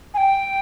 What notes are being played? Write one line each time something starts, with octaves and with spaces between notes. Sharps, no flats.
G#5
G5